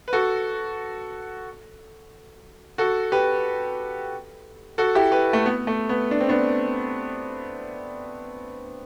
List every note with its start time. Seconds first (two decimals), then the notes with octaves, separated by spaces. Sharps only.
0.08 B4
0.13 F#4 A4
2.78 F#4 A4
3.12 G4 B4
4.78 F#4 A4
4.95 E4 G4
5.12 G4 B4
5.33 A3
5.46 B3
5.67 A3
5.89 B3
6.11 D4
6.20 C4
6.29 B3 D4